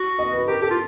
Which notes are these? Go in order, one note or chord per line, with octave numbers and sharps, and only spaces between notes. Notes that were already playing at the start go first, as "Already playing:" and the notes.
Already playing: F#4
D#5
B4
G4 A#4
G4 A4
F4